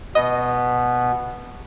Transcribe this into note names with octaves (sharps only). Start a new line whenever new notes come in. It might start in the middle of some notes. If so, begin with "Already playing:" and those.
B2 B3 D#5